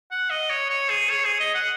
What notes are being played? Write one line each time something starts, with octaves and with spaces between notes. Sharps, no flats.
F#5
D#5
C#5
C#5
G#4
C#5
G#4
D#5
F#5